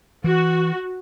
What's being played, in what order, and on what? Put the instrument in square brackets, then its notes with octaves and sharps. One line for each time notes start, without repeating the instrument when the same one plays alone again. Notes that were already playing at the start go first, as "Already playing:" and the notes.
[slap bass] E3 [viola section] F#4